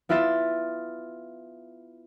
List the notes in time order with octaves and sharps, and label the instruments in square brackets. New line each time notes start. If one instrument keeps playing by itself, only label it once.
[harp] B3 E4 F4 E5 A6